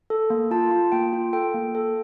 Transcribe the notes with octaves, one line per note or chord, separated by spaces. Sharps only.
A4
A#3
F4 A5
F4
A#3 G5
F4
A4 G5
A#3
A4